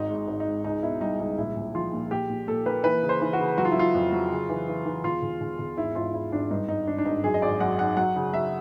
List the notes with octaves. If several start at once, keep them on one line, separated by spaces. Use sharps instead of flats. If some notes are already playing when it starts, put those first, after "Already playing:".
Already playing: G#1 D#4
G#2
D#4
G#1
D#4
G#2
C#2 D#4
B2 E4
G3 D#4
C#2 D#4
A#1 E4
A#1
F3 F4
A#2
A#2 G4
A#2
A#2 A4
A#3 B4
E3 B4
C#3
C5
E3
F#4
C#3
F#3 F#4
F4
E4
F#3 F4
F2
F#3
C#3
E3
E3
E3
E1 F4
E1
E1
E1
G#1 E4
G#1 F4
G#1 E4
G#1 D4
G2 D#4
G2 D#4
G#1 D4
D4
G#1 D#4
F#2 G#4
D#5
G#1 D5
F#2 F#5
D#3 F#5
F#3 F#5
C#3
F#3 E5